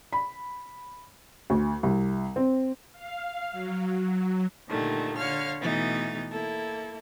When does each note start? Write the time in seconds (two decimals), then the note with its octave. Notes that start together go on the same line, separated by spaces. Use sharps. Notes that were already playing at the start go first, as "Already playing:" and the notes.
0.13 B5
1.50 D2
1.83 C2
2.36 C4
2.92 F5
3.52 F#3
4.69 A#2 D3 D#3 G3 A3
5.18 D3 C#5 F5 F6
5.61 B2 E3 A3 D#4 A6
6.31 A#3 E4 A4